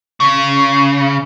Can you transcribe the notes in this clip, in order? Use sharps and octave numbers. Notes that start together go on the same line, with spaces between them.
C#3